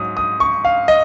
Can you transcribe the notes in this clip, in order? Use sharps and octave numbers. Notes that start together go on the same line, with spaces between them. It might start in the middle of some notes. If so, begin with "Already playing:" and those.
Already playing: G#2 F#3 C#4 D#6
D#6
C#6
F5
D#5